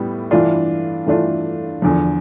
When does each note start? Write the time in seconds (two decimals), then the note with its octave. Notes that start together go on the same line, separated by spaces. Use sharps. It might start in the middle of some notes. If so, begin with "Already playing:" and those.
Already playing: A2 G3 B3
0.31 G2 E3 A3 D4 F4
1.06 G2 E3 A3 D4 F4
1.82 E2 D3 F3